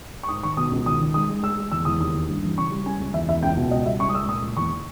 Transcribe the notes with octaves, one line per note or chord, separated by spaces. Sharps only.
C#6
G#2 D#6
D#3 C#6
B2 D#6
C#2
D#3 D#6
D#3
G#3 D#6
G#3
G#3 E6
G#3
E2 E6
E2 D#6
D#2 D#6
D#2
G2
E3
C#3 C#6
G3
C#3 G#5
C#2
E2 E5
E2 E5
C#2 G5
B2
C#2 D#5
G3 E5
C#2 C#6
D#6
G#3 E6
A#2 D#6
A#2
E2 C#6